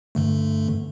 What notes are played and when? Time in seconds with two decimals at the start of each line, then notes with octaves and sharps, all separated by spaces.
0.15 G2 D3 A3